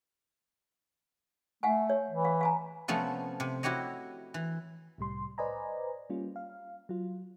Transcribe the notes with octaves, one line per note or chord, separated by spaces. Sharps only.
A3 F5 F#5 G#5
C#5
E3
F5
F5 G#5 A#5
C3 F3 A3 B3 C#4
C3
E4 F#4 G4 C#5 D#5
E3
C2 A2 G3 C6
B4 C5 D5 D#5 G#5 A#5
G3 A#3 C#4 F4
F5
F#3 F4